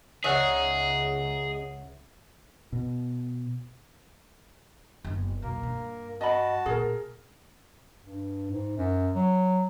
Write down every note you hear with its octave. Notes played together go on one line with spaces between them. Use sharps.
C#2 C#3 D#4 G#4 C#5 E5 F#5
B2
F#1 B3
B1 F2 A#3 A#4
G2
F#4 D#5 A5 B5
A#2 G#4 A#4
G2
G#2
F#2
F#3